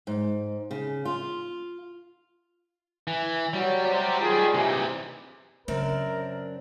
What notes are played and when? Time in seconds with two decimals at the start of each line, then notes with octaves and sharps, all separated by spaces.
0.07 G#2
0.71 C#3
1.05 F4
3.07 E3
3.53 F#3 G3
3.85 C3 F#3 G3 G4
4.20 D#3 F4 G#4
4.54 C3 E3 D#4 G4
5.68 F#2 C#3 C4 D4 A#4